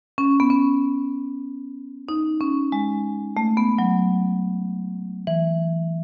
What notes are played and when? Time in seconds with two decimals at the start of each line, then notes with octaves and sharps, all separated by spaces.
0.18 C#4
0.40 B3
0.50 C#4
2.09 D#4
2.41 C#4
2.72 G#3
3.37 A3
3.57 B3
3.79 F#3
5.27 E3